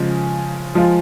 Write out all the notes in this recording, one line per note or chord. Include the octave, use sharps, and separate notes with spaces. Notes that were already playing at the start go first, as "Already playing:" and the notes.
Already playing: C#3 F3 G#3
F3 G#3 F4